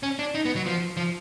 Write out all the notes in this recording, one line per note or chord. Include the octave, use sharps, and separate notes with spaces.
C#4
D4
D#4
B3
F#3
F3
F3